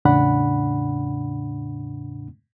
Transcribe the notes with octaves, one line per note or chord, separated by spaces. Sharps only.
E2 A2 C#3 D4 F#5 B5